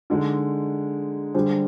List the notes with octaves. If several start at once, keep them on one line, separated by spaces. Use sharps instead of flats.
D3 G#3 D#4
D3 G3 D4 G#4 C5